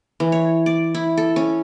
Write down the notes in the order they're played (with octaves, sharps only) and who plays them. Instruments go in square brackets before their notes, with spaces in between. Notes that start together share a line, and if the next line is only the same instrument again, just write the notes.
[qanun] E3
C#5
D5
E4
A4
C#4